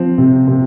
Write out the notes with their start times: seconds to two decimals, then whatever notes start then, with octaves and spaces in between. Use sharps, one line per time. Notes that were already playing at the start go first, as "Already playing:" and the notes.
Already playing: F3 C4
0.18 C3
0.47 C3